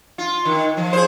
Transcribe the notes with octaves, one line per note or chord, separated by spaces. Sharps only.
F4
D#3
F3
G#4 C5